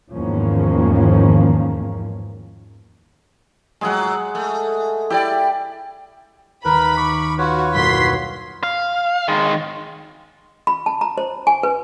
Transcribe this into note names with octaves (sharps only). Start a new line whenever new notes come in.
E2 G#2 D#3 F3 A#3 C#4
A2 F#3 G#3 G#4 F#5
A3
E4 G4 A4 D5
D#2 A#4 B4 B5
C#6 D6
F4 F#4 B4 C#5
F#1 B1 F#2 C6 B6 C7
F5
D#3 G#3
B5
A5
A#5
C5
G#5
B4